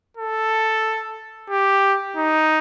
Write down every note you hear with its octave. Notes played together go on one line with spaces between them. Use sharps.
A4
G4
D#4